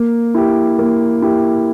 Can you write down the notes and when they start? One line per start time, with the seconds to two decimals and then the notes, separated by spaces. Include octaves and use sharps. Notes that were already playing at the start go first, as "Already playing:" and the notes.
Already playing: A#3
0.35 E4 G4
0.79 A#3
1.22 E4 G4